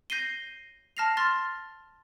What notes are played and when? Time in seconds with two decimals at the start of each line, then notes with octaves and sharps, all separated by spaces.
0.10 G6 A#6 C7 D#7 G7
0.97 A5 F6 A#6 C7 F7
1.17 C6 F6 A6